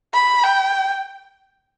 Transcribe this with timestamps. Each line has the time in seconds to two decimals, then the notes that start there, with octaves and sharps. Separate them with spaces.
0.13 B5
0.43 G5